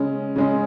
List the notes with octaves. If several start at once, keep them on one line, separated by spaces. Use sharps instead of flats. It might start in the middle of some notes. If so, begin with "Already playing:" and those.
Already playing: C#3 G#3 C#4
C#3 G#3 C#4